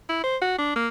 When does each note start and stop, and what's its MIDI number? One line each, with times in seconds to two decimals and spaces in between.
0.09 0.22 64
0.24 0.37 72
0.42 0.57 66
0.59 0.74 62
0.76 0.88 58